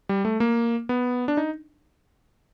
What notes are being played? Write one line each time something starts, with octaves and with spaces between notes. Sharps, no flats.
G3
A3
A#3
B3
D4
D#4